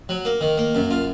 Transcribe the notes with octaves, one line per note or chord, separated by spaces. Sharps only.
F#3
A#3
D#3
A#3
F#2
F4